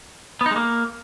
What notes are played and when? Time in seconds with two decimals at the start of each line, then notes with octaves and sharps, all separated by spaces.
0.41 B3
0.46 D#4
0.51 G#3
0.56 A#3